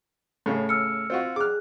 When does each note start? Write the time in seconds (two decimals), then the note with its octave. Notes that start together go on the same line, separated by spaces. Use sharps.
0.46 A2 C#3
0.69 E6 F6 C#7
1.10 C4 F4 F#4
1.36 G#4 D6 F6 F#6